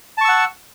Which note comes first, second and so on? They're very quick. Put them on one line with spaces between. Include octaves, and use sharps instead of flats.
A5 C#6 E6 F#5